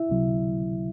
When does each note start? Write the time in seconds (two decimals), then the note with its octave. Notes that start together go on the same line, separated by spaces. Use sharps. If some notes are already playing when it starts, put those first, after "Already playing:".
Already playing: E4 E5
0.09 C#2 C3 F#3